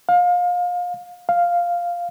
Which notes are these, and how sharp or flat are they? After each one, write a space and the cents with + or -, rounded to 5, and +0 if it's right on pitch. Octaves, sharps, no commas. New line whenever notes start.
F5 +30
F5 +0